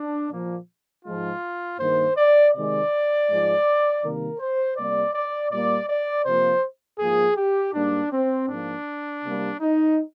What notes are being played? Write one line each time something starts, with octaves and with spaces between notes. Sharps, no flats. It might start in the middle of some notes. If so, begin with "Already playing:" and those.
Already playing: D4
A#2 F3 A#3
G#2 F3 G#3 F4
G2 D#3 A#3 C5
D5
C3 D#3 G#3 D5
G#2 F3 G#3
C3 D#3 G3 A#3 A#4
C5
C3 G3 A#3 D5
D5
A#2 G3 A#3 D5
D5
C3 F3 A#3 C5
G#2 F3 A#3 G#4
G4
G#2 G3 A#3 D4
C4
G#2 F3 A#3 D4
C3 G3 A#3
D#4